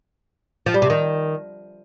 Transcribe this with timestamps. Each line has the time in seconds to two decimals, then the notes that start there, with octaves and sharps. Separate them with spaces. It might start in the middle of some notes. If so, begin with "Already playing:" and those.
0.66 F3
0.74 G3
0.82 C3
0.90 D#3